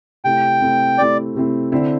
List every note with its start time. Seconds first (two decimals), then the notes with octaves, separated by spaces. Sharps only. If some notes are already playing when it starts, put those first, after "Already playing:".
0.24 C3 A3 C4 E4 G5
0.61 C3 A3 C4 E4
0.98 C3 A3 C4 E4 D5
1.35 C3 A3 C4 E4
1.72 D3 C4 E4